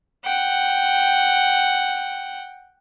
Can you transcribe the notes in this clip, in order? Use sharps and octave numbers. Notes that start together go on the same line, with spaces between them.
F#5 G5